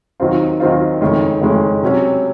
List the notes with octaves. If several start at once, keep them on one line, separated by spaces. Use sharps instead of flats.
D#2 D#3 F#3 C4 F4
D#2 D#3 F#3 C4 F4
F#1 F2 D#3 G#3 C#4
F#1 F2 D#3 G#3 C#4
C3 F#3 C#4